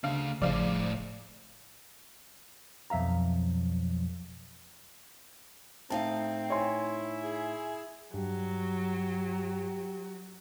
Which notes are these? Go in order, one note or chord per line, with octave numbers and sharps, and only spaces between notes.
D2 C#3 D4 F5
G#1 A2 C#3 F3 C5 D5 F5
F1
B1 F2 E5 F5 A#5
A2 C4 D#4 F5 A5
E4 C#5 G#5 C6
G#4
G2 F#3 G4